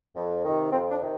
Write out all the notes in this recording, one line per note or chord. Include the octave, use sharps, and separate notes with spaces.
F2
C3 D#3
F2 C4
D4
C3 D#3